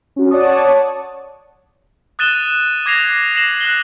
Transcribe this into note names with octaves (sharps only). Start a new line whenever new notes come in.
C#4 F#4
C#5 D5 F#5 A5 C#6 D#6
D#6 F#6 A6 D#7 E7 G7
D6 G#6 A#6 C7 F7
A#6 C7 E7 F#7
F#6 F#7 G7